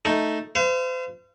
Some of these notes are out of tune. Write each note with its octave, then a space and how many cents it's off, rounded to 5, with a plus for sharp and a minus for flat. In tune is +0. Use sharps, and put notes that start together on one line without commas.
A3 +0 D#4 +0
C5 -40 F5 -40